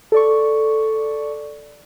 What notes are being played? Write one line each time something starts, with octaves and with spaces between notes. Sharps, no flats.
A4 D5 C#6